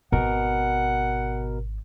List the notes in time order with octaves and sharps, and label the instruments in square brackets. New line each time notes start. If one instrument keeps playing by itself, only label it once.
[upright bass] G#1 [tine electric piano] B2 A#4 [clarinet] F#5